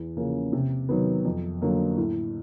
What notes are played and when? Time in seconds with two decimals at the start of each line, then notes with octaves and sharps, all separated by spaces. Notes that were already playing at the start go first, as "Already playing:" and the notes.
Already playing: E2
0.17 C#3 F3 A#3 C#4
0.53 C3
0.89 D#3 F#3 B3
1.25 F2
1.62 D3 F#3 A#3
1.97 A2